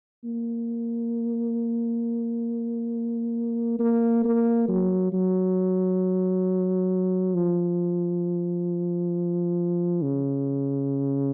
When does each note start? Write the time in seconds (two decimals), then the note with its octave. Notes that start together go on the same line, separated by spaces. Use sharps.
0.25 A#3
3.80 A#3
4.25 A#3
4.68 F#3
5.13 F#3
7.35 F3
10.03 C#3